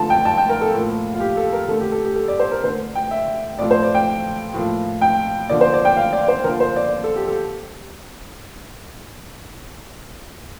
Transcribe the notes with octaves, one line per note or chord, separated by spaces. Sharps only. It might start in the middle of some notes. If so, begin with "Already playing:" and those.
Already playing: D3 F3 A3 A5
G5
A5
G5
A#4
A4
A2 F3 A#3
F4
G4
A4
A#4
D3 A3 A4
G4
A4
G4
A4
D5
C5
A#4
D3 A3 C5
G5
E5
A2 F3 A3 D5
C5
D5
G5
A2 F3 A#3
G5
D3 F3 A#3 D5
C5
D5
G5
F5
D5
C5
D3 F3 A#3 A#4
C5
D5
A4
G4
A4